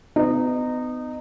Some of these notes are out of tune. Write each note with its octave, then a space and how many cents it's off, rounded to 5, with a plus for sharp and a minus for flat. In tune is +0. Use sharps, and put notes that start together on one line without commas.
B3 +35 D#4 -20